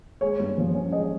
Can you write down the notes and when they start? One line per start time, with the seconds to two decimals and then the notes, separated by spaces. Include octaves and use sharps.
0.21 G#3 C#5
0.39 G2
0.58 F3
0.75 C#4
0.92 G#3 D#5